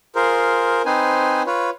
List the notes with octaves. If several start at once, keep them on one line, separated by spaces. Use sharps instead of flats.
F4 G#4 A#4 C5
C4 D#4 B4 C5 G#5
F4 B4 C#5